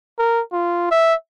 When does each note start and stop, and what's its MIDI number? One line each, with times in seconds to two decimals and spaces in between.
0.19 0.41 70
0.53 0.90 65
0.91 1.14 76